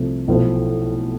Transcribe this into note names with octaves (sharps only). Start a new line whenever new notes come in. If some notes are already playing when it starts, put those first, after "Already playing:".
Already playing: C2 C3 F3 A3
B1 A2 F3 A3 E4